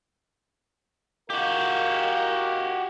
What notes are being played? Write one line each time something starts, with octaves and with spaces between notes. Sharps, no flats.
F#4 G4 A#4 D#5 F5